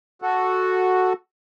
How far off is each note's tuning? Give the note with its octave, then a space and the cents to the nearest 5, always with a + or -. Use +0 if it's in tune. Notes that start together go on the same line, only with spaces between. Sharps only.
F#4 +0 A4 +0